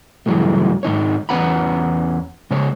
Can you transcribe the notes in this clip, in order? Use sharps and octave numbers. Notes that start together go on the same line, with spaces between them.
C#2 G2 E3 F#3 G#3 A3
G#2 D#3 D#4 C#5
E2 C#4 B4 F#5 A#5 B5
C#3 G#3 C5 C#5